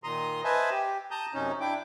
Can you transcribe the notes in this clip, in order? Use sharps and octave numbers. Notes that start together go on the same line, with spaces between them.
A#2 D#3 A#5 C6 D#6
B4 C5 D#5 E5 G#5 A5
G4
A5 A#5 D#6 G6
F#2 C3 C#4 D#4
D4 E4 G5 D6